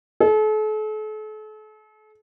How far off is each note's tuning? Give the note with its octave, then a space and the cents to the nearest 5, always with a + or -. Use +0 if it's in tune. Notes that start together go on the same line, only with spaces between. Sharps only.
A4 -40